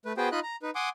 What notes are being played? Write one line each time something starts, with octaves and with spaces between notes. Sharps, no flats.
A3 B4
B3 F#4 G#4 B4 C5 G5
D#4 F4 D#5 B5 F#6
A#5
D#4 B4
F#5 G#5 C6 D6 D#6